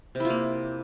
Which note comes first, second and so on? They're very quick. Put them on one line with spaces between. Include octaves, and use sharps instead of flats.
C3 E4 F4 A#3